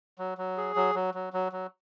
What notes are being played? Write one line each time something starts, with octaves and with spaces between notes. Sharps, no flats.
F#3
F#3
G#4
F#3
F#3
F#3
F#3
F#3